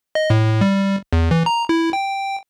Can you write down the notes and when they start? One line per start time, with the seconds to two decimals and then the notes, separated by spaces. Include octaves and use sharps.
0.15 D#5
0.30 A2
0.61 G3
1.13 E2
1.31 E3
1.46 A#5
1.69 E4
1.93 G5